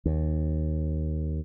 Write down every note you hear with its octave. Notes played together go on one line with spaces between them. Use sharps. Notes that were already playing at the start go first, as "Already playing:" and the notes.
D#2